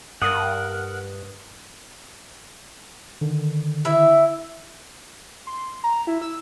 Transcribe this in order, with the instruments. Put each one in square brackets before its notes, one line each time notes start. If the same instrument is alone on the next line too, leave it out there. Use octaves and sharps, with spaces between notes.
[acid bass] G2 [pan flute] A#4 [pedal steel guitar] F#5 [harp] D#6
[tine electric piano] D3 D#3
[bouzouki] E4 E5
[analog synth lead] C6
A#5
E4
E6